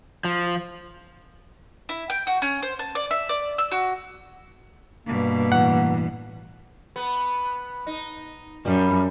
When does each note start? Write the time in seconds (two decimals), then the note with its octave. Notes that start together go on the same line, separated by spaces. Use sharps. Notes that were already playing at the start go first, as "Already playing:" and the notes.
0.25 F3
1.89 E4
2.10 G5
2.27 F#4
2.42 C#4
2.62 C5
2.79 A5
2.95 D5
3.11 E5
3.29 D5
3.58 E6
3.72 F#4
5.06 G2 B2 A#3
5.52 A2 E3 F#5
6.96 B3
7.87 D#4
8.65 F#2 G3